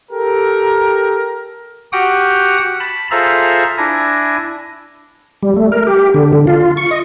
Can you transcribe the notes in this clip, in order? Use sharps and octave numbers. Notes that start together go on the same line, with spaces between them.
G4 A4 A#4
F#4 G4 F#5 G5 D#6 F6
A5 B5
F4 G#4 A4 C5 E5 A#5
D4 E4 G#5 A#6
G3
A3
A#4
G4
D3
D3
F4
C#6
D#5